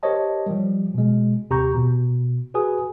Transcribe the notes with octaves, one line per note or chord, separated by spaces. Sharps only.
G4 A#4 C5 C#5 D#5 A5
F3 G3
B2 G#3
D#2 C3 G4 A#5 C#6 G6
B2
F#4 G#4 B4 G#5 D#6